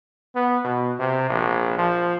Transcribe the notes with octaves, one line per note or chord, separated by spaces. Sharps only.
B3
B2
C3
A#1
F3